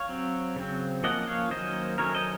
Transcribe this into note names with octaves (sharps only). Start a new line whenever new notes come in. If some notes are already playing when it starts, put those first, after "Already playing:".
Already playing: C#5 F5
F#3 C4
C#3 F#3 C4
F3 A#3 C#4 D#5 F#5
C#5 F5
D#3 F#3 A#3 C#4 C5 D#5
D#3 F#3 A3 C#4 A#4 C#5
C5 D#5